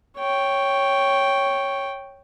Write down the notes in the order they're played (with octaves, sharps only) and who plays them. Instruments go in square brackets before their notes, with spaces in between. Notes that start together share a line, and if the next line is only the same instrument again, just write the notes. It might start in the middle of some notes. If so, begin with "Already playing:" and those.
[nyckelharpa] C#5 G5